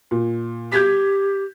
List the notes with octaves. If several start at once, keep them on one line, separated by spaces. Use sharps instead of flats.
A#2
G4 G6 G#6 B6